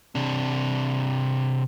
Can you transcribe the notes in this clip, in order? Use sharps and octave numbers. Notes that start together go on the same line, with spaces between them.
C3 D4